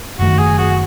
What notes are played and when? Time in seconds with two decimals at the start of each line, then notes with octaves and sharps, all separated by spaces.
0.19 F#1 F#2 D#3 A3 F#4
0.38 G#4
0.58 F#4